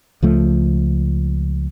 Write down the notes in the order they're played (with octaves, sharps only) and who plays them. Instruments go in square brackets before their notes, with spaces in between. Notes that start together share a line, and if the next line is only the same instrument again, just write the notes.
[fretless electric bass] C#2 F3 A3